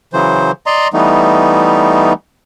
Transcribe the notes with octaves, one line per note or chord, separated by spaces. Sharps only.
C#3 E3 F#3 C5
D5 D#5 A#5 C6
E3 G3 A3 B3 D#4